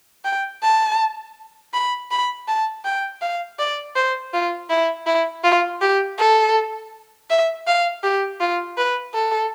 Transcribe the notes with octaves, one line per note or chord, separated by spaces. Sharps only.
G5
A5
B5
B5
A5
G5
F5
D5
C5
F4
E4
E4
F4
G4
A4
E5
F5
G4
F4
B4
A4